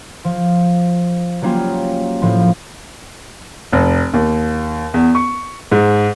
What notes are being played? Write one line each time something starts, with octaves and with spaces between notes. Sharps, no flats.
F3
F#3 G3 A#3 C#4 F4
A2 F3
F1
D#2
E2
C#6
G#2